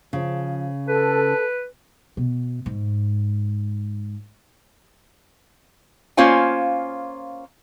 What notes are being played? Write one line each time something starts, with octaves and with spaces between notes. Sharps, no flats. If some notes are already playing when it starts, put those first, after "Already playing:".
C#3 F3
A4 B4
B2
G#2
A#3 C#4 F4 C5 F5 G#5